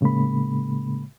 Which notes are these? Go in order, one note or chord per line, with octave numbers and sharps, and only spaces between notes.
A2 C#3 G#3 A#3 B5